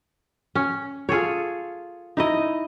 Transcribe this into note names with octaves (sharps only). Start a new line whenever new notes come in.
C#4
F4 G#4 A4 C#5
D#4 E4 D#5